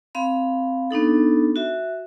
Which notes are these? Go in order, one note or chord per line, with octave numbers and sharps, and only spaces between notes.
C4 F5 B5
B3 D4 D#4 A4
F#4 E5